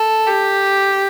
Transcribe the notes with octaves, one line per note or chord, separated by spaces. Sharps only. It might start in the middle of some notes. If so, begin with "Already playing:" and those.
Already playing: A4
G4